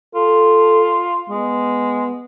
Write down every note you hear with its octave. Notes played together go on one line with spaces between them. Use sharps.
F4 A4
G#3 B3